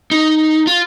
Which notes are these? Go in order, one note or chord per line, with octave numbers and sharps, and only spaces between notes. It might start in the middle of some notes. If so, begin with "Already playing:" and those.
D#4
F4